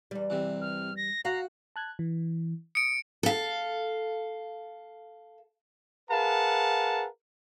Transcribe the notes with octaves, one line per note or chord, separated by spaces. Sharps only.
E2 G3
C3 E3
F6
A#6
F#4 F5 A#5
A5 F#6 G#6
E3
D#6 C#7 D7
A4 F5
G#4 A#4 B4 F5 F#5 A5